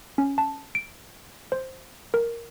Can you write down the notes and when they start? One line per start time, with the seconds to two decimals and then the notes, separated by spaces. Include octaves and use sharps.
0.18 C#4
0.38 A5
0.75 D7
1.52 C5
2.14 A#4